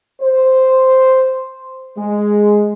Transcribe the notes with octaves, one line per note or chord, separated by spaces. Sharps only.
C5
G#3